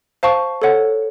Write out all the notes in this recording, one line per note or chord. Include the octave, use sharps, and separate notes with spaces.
C5 F5 A5 C#6
A4 C#5 F#5